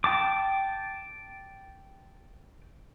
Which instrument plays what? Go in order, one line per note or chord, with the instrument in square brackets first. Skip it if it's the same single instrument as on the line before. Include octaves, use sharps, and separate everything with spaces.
[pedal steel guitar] G5 A5 D6